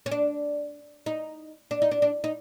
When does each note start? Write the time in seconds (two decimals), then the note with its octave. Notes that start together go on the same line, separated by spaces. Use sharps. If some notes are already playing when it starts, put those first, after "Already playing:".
0.06 C#4
0.11 D4
1.06 D#4
1.71 D4
1.82 D#4
1.91 D4
2.02 D4
2.24 D#4